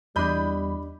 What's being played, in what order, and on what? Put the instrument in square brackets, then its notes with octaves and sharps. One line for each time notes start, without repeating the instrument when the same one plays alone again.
[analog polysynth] E2 [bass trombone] G3 [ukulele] D4 D#5 [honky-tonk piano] B5 G6